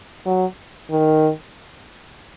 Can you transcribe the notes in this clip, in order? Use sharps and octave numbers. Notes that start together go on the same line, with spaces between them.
F#3
D#3